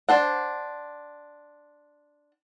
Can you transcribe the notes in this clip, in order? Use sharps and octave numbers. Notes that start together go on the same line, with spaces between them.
D4 C5 F#5